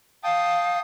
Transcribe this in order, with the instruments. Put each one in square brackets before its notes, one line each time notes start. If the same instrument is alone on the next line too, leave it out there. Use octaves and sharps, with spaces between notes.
[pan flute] F5 [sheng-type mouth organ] G5 A5 D#6